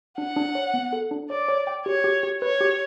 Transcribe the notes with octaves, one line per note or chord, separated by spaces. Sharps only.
D4 F#5
D4
C#5
B3
A4
D4
C#5 D5
C#5
G5
G4 C#5
G4
G4
B4 C#5
G4